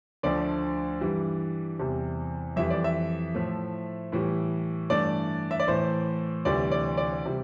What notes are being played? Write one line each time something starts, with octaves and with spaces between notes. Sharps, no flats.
D2 D3 F3 A3 D5
G2 E3 G3
E2 C3 G3
F2 E3 G3 E5
D5
E5
A2 F3 A3
A2 E3 G3
G2 E3 A3 D5
E5
D5
A2 E3 A3 C5
D2 C3 E3 G3 D5
D5
D5
C3 G3